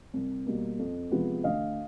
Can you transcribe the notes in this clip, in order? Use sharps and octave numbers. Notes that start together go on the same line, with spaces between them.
C2
B2 G3 A#3
F2
C3 F3 G#3 B3
D2 D#5 F5